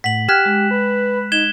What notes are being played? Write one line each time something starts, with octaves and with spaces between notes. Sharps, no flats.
A2 F#5 B6 F#7
G4 G5 F6 F#6 G#6 B6 E7
G#3
B4
D#4 G#6 E7 G7